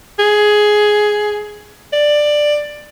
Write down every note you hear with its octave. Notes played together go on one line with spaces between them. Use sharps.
G#4
D5